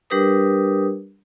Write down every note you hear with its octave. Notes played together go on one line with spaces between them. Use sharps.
G3 D4 G4 A#4 B4 D#6